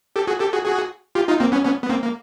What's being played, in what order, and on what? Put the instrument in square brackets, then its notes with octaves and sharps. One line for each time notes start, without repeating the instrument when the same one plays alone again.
[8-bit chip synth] G4 A4
F#4 G#4
G4 A4
F#4 G#4
F#4 G#4
F4 G4
D#4 F4
A#3 C4
B3 C#4
B3 C#4
B3
A#3 C4
A#3